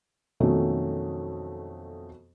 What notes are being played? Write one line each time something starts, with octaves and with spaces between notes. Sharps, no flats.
F2 B2 D#3 F#3 A3 C#4